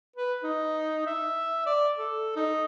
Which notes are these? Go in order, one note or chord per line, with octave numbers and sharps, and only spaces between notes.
B4
D#4
E5
D5
A4
D#4